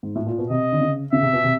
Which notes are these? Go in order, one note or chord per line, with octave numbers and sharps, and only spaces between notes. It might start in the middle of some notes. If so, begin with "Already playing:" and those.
G#2
A2
A#2
B2
C3 D#5
D3
C#3
C#3 E5
C3
B2
C3